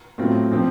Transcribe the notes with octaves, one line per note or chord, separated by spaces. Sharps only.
A2 F#3 C4 F4
A#2 F3 C4